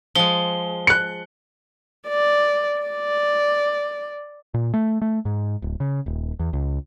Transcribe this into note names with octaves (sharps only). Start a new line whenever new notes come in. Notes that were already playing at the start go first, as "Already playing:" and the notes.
F3 G#3 G7
F#6 C#7
D5
D5
A#2
A3
A3
G#2
D1
C#3
D#1
E2
C#2